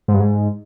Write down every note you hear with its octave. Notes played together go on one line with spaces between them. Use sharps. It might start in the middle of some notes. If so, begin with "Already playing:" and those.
G#2
G2
G#2